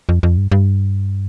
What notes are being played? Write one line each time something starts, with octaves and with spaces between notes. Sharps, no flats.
F2
F2
G2
G2